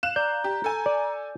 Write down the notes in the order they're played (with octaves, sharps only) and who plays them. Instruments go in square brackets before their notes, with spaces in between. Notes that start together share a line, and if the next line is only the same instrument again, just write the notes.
[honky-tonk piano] F5 F#6 E7
[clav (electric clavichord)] D5 [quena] A#5 [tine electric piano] G6
[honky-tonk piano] G4
A4 G#5
[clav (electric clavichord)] D5